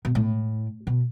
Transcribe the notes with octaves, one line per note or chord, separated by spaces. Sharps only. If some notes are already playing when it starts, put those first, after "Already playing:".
B2
A2
B2